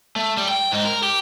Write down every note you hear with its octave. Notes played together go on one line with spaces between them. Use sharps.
A3
G3
G5
G#2 D#4
A#4
G4